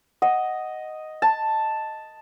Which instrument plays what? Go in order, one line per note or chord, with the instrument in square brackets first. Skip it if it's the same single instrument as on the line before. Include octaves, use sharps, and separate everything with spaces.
[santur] D#5 [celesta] F#5
[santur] A5